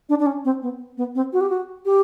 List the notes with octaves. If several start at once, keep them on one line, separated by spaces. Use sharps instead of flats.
D4
D4
C#4
C4
B3
B3
C4
F#4
G4
F#4
G4